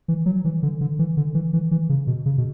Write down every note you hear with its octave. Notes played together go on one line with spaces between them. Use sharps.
E3
F#3
E3
D3
D3
E3
D3
E3
E3
E3
C#3
B2
C#3
B2